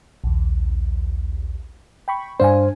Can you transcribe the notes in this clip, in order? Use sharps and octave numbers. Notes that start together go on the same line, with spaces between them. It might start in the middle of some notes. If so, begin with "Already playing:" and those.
A#1 D#2
G5 B5 C#6
G2 D4 C5 F5 G#5